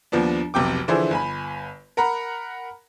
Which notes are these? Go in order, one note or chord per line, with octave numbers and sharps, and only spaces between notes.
D#2 F3 B3 D4
F1 B1 C3 G5 D6
D3 E3 F3 E4 G#4 C5
G1 G#5 B5
A#4 F#5 A#5 B5